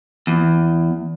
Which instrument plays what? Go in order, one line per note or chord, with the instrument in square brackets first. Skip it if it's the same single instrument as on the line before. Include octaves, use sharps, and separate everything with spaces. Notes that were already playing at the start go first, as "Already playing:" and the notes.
[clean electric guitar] E2